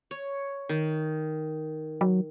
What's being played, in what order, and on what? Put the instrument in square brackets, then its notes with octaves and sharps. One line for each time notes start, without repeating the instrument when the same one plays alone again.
[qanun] C#5
D#3
[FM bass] F#3